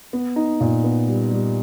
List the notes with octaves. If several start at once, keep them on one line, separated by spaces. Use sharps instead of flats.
B3
D#4
A#2
B3
G3
G3